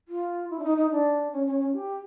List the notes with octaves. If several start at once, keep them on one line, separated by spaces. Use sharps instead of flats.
F4
E4
D4
D#4
D#4
D4
C#4
C#4
C#4
G4